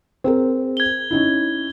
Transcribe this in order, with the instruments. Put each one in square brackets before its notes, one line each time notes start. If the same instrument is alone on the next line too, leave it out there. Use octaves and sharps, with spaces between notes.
[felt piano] C4 G#4 A#4
[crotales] G#6 G7
[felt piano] C#4 D#4 E4